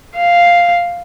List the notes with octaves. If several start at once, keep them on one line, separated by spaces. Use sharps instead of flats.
F5